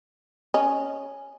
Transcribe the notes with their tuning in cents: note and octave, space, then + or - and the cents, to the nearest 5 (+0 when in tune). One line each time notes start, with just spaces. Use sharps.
C#4 +0 D#5 +0